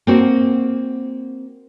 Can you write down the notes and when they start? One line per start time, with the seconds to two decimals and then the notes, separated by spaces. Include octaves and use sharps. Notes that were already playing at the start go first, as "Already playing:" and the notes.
0.07 A#3 C4 F#4